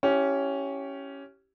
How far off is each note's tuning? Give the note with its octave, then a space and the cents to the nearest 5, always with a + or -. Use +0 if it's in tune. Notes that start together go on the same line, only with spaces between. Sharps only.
C#4 +0 E4 +5 G4 -20